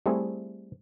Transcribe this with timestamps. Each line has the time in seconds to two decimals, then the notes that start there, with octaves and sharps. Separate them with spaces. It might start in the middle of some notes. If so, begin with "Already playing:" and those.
0.06 G3 A3 C4 E4 G#4